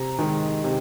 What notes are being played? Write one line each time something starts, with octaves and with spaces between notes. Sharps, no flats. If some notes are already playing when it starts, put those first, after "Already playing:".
Already playing: C3 A#5
D#3 G#3
C3